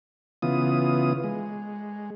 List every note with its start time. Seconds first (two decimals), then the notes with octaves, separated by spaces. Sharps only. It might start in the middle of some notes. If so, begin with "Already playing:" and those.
0.42 C#3 E3 B3 F4 D#6
1.24 G#3